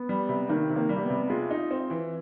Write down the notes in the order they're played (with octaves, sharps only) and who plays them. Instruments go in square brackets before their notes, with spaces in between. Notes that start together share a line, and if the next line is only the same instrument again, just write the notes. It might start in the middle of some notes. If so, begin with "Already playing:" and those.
Already playing: [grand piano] B3
[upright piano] G3
C3
[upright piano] D#3 [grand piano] A#3
[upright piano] C3
[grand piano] A#3
[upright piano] G3
[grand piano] A#3
B3
[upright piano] C3
[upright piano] G#3 [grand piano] F4
[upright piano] D#4
C4
E3